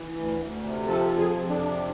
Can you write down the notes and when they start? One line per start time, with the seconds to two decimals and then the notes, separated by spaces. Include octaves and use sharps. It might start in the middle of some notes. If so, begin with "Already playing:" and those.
Already playing: E3
0.17 D2
0.40 D2
0.64 C3
0.87 F3 A4
1.10 F2
1.18 G#4
1.34 F2
1.50 D4
1.57 C3